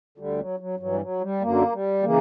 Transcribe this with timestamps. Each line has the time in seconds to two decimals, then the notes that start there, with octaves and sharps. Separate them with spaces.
0.18 D2 D3 G3
0.40 F#3
0.60 F#3
0.80 G2 E3 F#3
0.92 G3
1.01 F#3
1.21 G3
1.41 F#2 D3 A#3
1.73 G3
2.03 C#3 E3 A#3